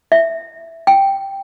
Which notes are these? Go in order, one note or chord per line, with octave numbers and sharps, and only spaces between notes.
E5
G5